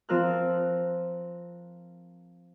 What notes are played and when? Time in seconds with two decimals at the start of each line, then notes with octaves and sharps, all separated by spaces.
0.09 F3 C4 F4 A#4 F6 F#6